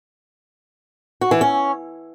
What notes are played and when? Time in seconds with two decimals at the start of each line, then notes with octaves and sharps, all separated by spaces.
1.21 F#4
1.31 E3
1.41 C#4